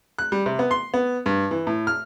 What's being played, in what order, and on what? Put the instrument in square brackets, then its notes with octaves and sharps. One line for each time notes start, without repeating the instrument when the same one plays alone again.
[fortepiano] F#6
G3
C3
B3
C6
B3
G2
E3
A2
F6